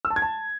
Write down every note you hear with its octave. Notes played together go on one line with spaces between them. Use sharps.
E6
A5
G#6
A5